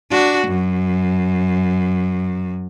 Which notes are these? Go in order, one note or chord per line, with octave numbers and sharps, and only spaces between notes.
D4 F#4
F#2